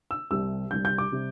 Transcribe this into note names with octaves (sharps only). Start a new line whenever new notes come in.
E6
C2 C3 G3 E6
C2 C3 G3 G6
G6
D6
C3 G3